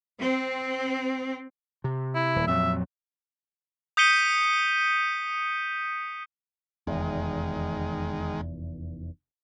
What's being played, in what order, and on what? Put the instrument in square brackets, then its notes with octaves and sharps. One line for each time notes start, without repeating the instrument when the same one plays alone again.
[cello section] C4
[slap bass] C3
[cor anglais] E4
[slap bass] D#1
[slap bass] F2 A#2 F#3 [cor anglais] E5
[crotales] D#6 G6 B6 C#7 D#7 G7
[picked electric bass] F1 E2 [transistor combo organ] D#3 G#3